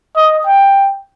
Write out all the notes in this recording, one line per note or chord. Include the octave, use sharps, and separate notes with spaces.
D#5
G5